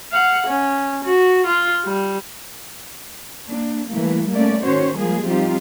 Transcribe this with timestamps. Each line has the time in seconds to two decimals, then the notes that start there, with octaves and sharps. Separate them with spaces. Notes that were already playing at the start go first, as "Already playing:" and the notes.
0.12 F5 F#5
0.47 C#4
1.04 F#4
1.46 F4
1.85 G3
3.47 A#3 D4
3.90 E3 G3 A3 A#3
4.30 G3 A3 A#3 C#4 D5
4.63 D#3 C#4 F#4 C5 C#5
4.97 F3 G3 G#3 A#3 G#4
5.25 F3 G3 C4 D#4 F4 G4